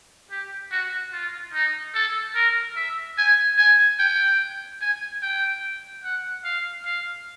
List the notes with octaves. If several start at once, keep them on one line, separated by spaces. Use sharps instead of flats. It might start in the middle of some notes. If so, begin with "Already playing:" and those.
G4
F#4
F4
D#4
A4
A#4
E5
G#5
G#5
G5
G#5
G5
F#5
F5
F5